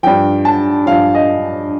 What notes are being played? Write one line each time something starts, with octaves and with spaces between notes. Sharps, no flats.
G2 F3 G5
A5
G2 F3 F5
D#5